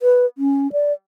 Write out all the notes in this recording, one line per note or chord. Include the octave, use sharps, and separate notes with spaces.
B4
C#4
D5